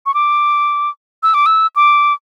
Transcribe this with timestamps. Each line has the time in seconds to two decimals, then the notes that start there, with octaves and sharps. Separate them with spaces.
0.06 C#6
0.14 D6
1.23 E6
1.34 D6
1.46 E6
1.76 D6